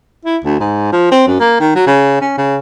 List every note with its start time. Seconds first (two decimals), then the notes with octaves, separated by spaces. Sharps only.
0.25 E4
0.44 D2
0.60 G#2
0.92 F3
1.11 C4
1.27 F#2
1.40 A#3
1.60 D#3
1.75 F#3
1.87 C#3
2.21 C#4
2.37 C#3